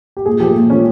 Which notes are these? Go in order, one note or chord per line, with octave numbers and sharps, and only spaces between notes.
G4
A#2 G#4
F3 A3 G4
A#2
F3 A3 C#4